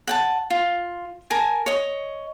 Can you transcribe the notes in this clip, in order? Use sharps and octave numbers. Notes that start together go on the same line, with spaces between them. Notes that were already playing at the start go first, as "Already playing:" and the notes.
F#5 G5 A5
F4
A#4 G#5 A5
C#5 D#5